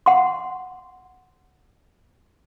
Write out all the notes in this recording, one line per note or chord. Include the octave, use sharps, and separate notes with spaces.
F#5 C6